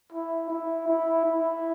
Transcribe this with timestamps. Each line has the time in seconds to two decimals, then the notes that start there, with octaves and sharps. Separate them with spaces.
0.12 E4
0.50 E4
0.88 E4
1.25 E4